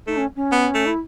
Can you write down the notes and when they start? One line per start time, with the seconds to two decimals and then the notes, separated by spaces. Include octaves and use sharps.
0.07 A3 D#4
0.17 C#4
0.36 C#4
0.52 B3
0.74 A3
0.86 E4